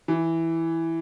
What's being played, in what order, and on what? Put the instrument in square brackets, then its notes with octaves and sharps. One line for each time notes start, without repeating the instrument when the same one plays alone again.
[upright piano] E3